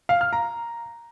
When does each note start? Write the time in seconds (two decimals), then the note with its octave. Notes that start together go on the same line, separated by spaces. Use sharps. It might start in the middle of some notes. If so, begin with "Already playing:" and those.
0.09 F5
0.21 F6
0.33 A#5